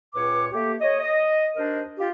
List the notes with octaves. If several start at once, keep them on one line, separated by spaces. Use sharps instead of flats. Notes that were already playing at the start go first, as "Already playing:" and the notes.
C#2 A#2 B4 C#5 D6
A3 A#3 G4
C#5 D#5
D#5
D#2 D4 A#4 C5 D#5
F4 G4